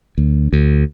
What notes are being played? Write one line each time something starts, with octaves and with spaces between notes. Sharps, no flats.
D2
D2